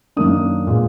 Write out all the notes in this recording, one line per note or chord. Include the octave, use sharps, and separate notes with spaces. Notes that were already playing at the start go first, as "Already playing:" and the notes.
F#2 D#3 A#3 D4 D#6
A#2 G#3 B3